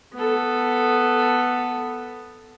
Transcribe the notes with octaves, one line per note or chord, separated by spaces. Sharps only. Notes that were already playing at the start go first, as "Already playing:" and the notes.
B3 A4